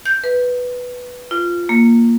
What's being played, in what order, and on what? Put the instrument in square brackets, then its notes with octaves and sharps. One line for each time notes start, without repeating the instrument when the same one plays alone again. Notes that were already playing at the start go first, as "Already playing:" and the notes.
[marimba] G6
B4
F4
A#3